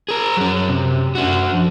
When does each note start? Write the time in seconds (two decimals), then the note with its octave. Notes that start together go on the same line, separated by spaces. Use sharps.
0.09 G#4 A#4
0.37 F#2 F#3 C#4
0.69 C3
1.15 F#2 D4 F#4
1.53 F3